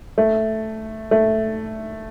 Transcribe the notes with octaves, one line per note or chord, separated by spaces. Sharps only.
A3
A3